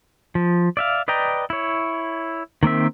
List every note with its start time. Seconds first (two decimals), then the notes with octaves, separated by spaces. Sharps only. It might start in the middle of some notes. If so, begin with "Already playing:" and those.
0.35 F3
0.77 D5 E5 F5
1.08 B4 D5 D#5 G5 A#5
1.50 E4 C#5
2.63 D#3 A#3 C4 E5